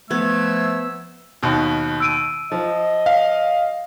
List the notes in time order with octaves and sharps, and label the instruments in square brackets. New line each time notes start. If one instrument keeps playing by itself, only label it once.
[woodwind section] F3 A3 [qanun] B3 [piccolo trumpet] E6 [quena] G#6
[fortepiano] D#2 B2
[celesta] E6 D7 D#7
[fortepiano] F3 [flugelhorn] D#5
[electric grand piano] F5